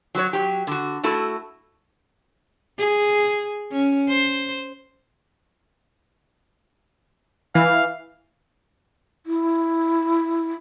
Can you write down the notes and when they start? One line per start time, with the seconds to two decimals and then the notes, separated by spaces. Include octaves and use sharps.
0.15 F#3 F#4 B4 C#5
0.33 F#3 G4
0.67 D3 F#4
1.03 A3 E4 F#4 A4
2.78 G#4
3.72 C#4
4.09 C5
7.55 E3 F5
9.26 E4